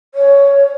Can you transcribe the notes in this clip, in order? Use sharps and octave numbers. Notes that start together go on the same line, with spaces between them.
C#5